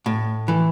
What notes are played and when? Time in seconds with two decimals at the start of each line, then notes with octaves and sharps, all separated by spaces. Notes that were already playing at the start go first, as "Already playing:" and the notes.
0.06 A2
0.48 E3